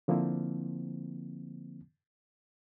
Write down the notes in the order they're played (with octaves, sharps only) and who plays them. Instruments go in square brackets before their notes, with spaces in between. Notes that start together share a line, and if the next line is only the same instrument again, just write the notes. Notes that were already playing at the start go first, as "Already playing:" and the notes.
[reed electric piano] D3 F3 A#3 C4 E4